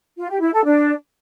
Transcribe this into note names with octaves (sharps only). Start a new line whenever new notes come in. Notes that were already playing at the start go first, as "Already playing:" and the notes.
F4
G4
E4
A4
D4